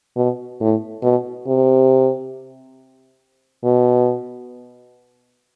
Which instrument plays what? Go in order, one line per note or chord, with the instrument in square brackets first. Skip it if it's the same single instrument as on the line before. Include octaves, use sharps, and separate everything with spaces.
[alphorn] B2
A2
B2
C3
B2